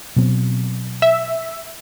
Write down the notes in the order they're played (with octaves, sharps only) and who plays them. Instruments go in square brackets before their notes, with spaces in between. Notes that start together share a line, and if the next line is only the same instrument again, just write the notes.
[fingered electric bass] B2 F#3 C4
[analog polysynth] E5